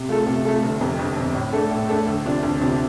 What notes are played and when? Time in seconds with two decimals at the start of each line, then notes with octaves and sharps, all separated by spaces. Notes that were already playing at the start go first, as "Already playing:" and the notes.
Already playing: C3
0.09 A3 F4 A4
0.26 C3
0.45 A3 F4 A4
0.63 G1
0.81 F2 C3
0.99 G1
1.17 F2 C3
1.34 A2
1.53 A3 D4 A4
1.71 A2
1.89 A3 D4 A4
2.07 D2
2.25 C3 F3 D4
2.43 D2
2.61 C3 F3 D4